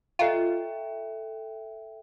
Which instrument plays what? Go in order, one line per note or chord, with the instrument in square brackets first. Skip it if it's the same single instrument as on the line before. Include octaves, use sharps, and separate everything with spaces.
[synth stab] F4 [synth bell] A4 E5 G5